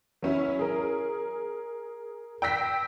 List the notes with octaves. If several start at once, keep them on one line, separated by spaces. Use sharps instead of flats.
F#3 C#4 E4
G#4 A#4
G5 E6 A#6 B6